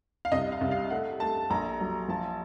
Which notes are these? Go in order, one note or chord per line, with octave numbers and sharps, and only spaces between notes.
F5
C2 D#5
F5
C2
F5
A3 F#5
A3 A5
A#1 A#5
F#3
F3 A5